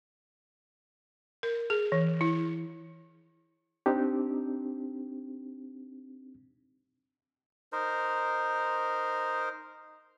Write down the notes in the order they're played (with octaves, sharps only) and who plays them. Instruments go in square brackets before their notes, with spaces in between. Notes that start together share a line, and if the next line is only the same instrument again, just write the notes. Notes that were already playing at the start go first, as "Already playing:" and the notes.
[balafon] A#4
G#4
E3
E4
[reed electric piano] C4 D4 D#4 G4
[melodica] D#4 A#4 C5